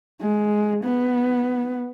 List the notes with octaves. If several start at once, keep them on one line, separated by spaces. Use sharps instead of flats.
G#3
B3